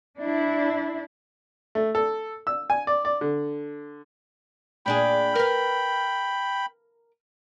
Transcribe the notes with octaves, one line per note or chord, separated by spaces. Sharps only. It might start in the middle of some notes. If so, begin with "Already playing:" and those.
D4 E4
A3
A4
E6
G#5
D5
D5
D3
A#2 D4 G#4 G5 B5
A#4 B4